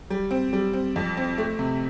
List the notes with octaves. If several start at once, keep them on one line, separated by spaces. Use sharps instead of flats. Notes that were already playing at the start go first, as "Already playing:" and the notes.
G3
C4
G3
C4
F2
C4
A3
C3